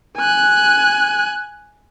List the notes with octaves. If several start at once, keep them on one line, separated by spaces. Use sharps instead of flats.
G#5 F#6